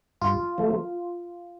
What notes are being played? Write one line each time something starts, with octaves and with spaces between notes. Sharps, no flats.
G2 F4
F3 A3